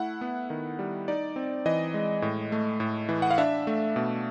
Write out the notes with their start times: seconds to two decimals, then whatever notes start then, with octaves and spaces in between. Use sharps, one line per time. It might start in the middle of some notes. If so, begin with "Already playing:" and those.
Already playing: A3 E4 F#5
0.21 B3
0.50 D#3
0.79 G3
1.08 D#4 D5
1.36 C4
1.66 E3 D#5
1.94 G#3
2.22 A2
2.52 A3
2.80 A2
3.09 E3
3.22 F#5
3.31 F5
3.38 D4 E5
3.67 A3
3.96 B2